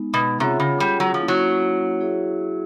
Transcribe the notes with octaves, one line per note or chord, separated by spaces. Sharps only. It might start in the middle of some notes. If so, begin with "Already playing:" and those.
Already playing: G#3 B3 D#4
B2
C3 C#4 F4 G#4 C#5 F#5
C#3
G3
F#3
F3
A#3 C#4 E4
F#3
E4 G#4 C#5 E5